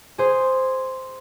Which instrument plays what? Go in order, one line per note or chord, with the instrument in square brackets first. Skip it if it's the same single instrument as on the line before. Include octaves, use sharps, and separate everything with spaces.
[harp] G#4 C5